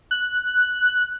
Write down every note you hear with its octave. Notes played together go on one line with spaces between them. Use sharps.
F#6